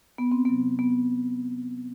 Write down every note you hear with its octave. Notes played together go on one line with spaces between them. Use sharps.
B3
C4
C3 F#3 B3
B3